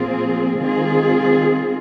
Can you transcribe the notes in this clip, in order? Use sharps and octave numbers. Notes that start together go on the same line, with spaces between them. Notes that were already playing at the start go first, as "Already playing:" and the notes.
Already playing: A#2 F3 C4 F4 G#4
D#3 G#3 C4 F4 G#4